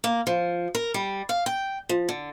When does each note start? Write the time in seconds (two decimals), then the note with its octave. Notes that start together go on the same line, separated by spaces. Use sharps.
0.04 A#3
0.27 F3
0.75 A#4
0.94 G3
1.29 F5
1.46 G5
1.89 F3
2.09 D3